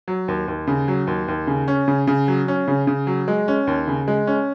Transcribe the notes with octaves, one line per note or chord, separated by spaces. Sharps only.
F#3
D#2
D#2
C#3
F#3
D#2
D#2
C#3
C#4
C#3
C#3
F#3
C#4
C#3
C#3
F#3
G#3
C#4
D#2
C#3
G#3
C#4